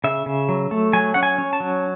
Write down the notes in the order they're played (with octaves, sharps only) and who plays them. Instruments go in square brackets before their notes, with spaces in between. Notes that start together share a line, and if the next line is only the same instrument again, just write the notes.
[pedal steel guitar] C#3 E5
C#3
F#3
A3
F#3 G#5
C#4 F#5
G#5
C#4
A5
F#3